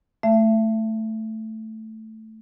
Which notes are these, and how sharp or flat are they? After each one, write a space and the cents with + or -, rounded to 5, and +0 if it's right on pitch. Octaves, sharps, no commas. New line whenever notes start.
A3 +0 E5 +30